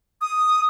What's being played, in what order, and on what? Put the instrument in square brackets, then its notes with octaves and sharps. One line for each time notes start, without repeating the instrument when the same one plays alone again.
[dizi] D#6